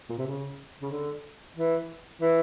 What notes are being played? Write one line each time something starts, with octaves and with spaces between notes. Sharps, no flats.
A#2
C3
C#3
C#3
D3
E3
E3